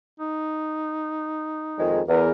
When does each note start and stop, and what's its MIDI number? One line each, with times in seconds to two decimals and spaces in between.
0.20 1.92 63
1.79 2.00 41
1.79 2.00 51
1.79 2.00 56
2.08 2.31 40
2.08 2.31 70